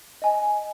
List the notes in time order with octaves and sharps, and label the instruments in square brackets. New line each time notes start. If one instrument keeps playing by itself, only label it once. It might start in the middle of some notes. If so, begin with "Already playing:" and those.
[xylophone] D#5 G#5